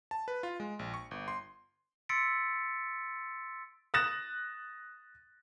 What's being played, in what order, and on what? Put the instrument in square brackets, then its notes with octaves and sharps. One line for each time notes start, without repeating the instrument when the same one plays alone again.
[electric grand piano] A5
B4
F4
G#3
A#1
C#6
G1
C6
[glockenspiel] C6 E6 A6 B6 C#7 D7
[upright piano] D#6 F#6 A6 A#6 E7